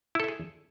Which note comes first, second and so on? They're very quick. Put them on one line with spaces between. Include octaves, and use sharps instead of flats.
E4 A4 E5 G#4